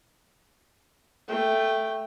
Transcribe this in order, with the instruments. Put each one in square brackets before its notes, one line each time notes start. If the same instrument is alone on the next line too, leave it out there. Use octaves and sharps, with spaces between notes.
[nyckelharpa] A3 G5